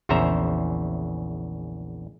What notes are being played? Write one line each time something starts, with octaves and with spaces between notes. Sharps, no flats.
A#1 E2 C#3 C5 E5 A#5